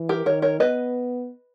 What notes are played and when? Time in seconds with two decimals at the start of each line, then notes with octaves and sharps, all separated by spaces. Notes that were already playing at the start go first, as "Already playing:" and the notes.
Already playing: E3
0.09 G4 A#4
0.26 D#3 A#4 C#5
0.42 A#4 C#5
0.60 B3 B4 D#5